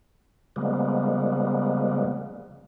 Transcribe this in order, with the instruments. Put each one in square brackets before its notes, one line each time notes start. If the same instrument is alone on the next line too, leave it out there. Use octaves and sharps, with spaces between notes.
[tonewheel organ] C#3 F3 G3 G#3 A#3 B3